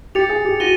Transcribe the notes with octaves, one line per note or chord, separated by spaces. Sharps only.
G4 A6 C#7 F7
G#4
G4
F#4 A#6 D#7 G7